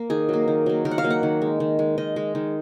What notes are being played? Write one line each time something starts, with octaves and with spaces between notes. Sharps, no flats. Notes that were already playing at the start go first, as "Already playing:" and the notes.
Already playing: A#3
D#3 G#4
F#3 A#3
D#3
F#3 A#3
D#3 A#4
F#5
F5
F#3 A#3
F#5
D#3
G#3
D#3
G#3
D#3 D#5
G#3
D#3